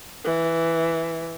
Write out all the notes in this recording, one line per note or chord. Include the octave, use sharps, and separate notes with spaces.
E3